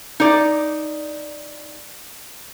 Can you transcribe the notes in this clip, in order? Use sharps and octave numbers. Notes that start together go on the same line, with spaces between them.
D#4 D5